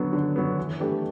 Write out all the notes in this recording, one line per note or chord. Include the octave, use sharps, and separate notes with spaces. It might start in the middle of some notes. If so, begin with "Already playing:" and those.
Already playing: D3 F#3 B3
D3
F#3 B3
E3
A3 D4 G4 B4